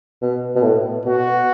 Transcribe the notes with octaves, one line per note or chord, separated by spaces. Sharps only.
B2
B2
A2
B2 F#4